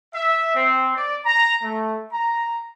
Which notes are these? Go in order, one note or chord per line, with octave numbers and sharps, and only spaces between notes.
E5
C4
D5
A#5
A3
A#5